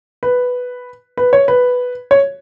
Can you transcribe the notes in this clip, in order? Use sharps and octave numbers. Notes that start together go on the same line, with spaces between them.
B4
B4
C#5
B4
C#5